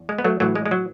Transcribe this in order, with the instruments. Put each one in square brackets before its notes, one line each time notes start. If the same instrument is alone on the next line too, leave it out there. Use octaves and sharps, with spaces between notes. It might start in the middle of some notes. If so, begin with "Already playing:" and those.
Already playing: [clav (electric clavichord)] E2
G#3
B3
F#3 A3
A1 A2 E3 F#3 A3
G#3
G#3
F#3